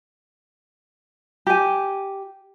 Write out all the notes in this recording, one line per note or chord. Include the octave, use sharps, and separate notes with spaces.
G4 G#5